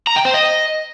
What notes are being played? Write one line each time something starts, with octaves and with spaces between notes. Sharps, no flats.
A#5
G5
C5
D#5